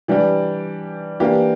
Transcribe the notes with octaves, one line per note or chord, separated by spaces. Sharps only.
E3 G3 D4 G4
E3 A#3 D4 G4